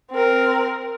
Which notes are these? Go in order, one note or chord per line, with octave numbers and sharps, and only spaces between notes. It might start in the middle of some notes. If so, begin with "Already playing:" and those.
C4 A#4